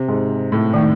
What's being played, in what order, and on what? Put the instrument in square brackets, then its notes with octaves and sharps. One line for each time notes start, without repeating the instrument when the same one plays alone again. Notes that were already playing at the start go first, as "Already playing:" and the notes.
Already playing: [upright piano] C3
G#2
A2
[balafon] D#3 A3 D#4